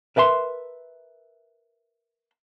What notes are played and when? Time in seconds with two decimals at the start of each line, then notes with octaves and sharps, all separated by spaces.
0.16 A#4 B4 E5 A5 C6